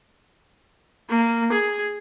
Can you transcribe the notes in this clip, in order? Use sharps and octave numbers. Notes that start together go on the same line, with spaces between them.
A#3
G#4